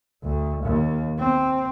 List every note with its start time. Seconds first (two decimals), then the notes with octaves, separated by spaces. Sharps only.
0.23 D2
0.64 D#2
1.19 C4